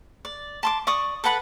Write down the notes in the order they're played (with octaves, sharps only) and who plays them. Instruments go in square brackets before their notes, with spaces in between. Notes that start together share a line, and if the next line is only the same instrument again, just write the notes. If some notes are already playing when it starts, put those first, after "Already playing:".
[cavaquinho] D5
A5 C6 D6
D5 C#6 D#6
A4 B4 F#5 B5